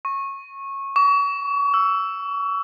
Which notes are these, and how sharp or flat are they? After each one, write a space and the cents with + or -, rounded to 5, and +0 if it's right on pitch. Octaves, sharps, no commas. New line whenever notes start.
C#6 -20
C#6 +35
E6 +5